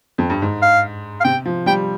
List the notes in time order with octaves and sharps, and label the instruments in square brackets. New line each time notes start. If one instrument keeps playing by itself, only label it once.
[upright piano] F2
G2
G#2
[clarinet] F5
F5
[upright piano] C3 [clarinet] G5
[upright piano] F3
[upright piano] G3 [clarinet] G5